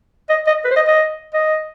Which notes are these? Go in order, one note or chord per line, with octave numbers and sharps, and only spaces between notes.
D#5
D#5
B4
C5
D#5
D#5
D#5